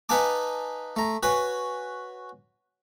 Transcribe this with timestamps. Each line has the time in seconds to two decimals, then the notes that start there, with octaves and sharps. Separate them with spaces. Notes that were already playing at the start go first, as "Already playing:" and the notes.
0.09 D#4 B4 F5 G#5 A5 D6
0.96 A3 A#5
1.23 F#4 B4 C#5 F#5 G#5